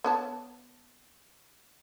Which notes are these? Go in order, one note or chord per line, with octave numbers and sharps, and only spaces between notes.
B3 C#5 A5